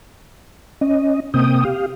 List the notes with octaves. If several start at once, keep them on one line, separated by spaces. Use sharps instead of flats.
C#4 D#5
C3 A#3 C4 G5 D#6
G4 F5